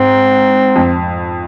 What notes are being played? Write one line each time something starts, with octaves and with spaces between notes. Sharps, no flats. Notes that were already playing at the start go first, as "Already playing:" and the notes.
Already playing: G#2 C4
F2